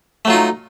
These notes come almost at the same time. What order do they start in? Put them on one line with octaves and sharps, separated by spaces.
A3 F#3 F4 D#4